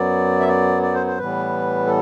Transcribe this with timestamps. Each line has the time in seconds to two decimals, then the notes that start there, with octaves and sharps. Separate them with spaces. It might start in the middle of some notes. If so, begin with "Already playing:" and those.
Already playing: F#2 F#3 B3 D5
0.40 E5
0.48 D5
0.82 D5
0.94 C5
1.06 C5
1.18 A2 E3 G3 B3 B4
1.86 A4